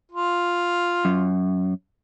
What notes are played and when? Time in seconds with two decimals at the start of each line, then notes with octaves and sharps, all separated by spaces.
0.11 F4
1.05 F#2